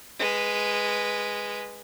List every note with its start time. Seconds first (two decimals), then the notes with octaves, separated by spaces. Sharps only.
0.19 G#3 B4